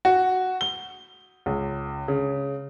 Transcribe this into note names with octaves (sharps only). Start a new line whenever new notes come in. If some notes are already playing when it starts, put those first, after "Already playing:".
F#4
G7
C#2
C#3